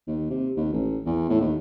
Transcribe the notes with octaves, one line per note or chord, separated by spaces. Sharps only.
D#2
C3
D#2
A1
E2
A2
D#2